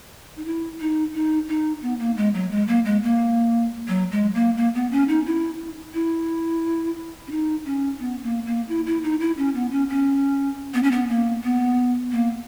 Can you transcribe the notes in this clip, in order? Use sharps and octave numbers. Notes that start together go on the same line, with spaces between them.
D#4
E4
D#4
D#4
D#4
B3
A#3
G#3
F#3
G#3
A#3
G#3
A#3
F#3
G#3
A#3
A#3
B3
C#4
D#4
E4
E4
C#4
D#4
C#4
B3
A#3
A#3
E4
E4
D#4
E4
C#4
B3
C#4
C#4
B3
C#4
B3
A#3
B3
A#3